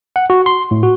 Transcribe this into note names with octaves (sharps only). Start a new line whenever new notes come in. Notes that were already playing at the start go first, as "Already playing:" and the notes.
F#5
F#4
C6
A2
F#4